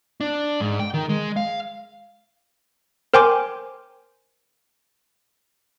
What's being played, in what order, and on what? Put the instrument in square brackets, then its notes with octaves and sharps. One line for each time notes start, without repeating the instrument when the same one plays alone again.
[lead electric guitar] D4
G#2
G5
D#3
G#3
F5
[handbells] A#4 C5 G5 G#5 C6 D6